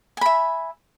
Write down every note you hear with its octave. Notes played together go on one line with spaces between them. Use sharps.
E5 G#5 B5